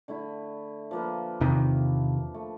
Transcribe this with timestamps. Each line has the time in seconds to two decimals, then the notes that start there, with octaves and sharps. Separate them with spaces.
0.08 D3 A3 E4
0.91 F3 A#3 B4
1.41 E2 C3 D#3
2.34 A3